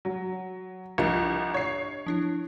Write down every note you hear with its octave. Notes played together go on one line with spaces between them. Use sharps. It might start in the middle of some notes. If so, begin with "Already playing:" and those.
F#3
C2 F3 D4 G4 D#5
C#5 C7
F3 D4 E4